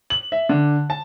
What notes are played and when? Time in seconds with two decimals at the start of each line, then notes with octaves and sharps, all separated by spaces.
0.10 F#7
0.32 E5
0.49 D3
0.90 A5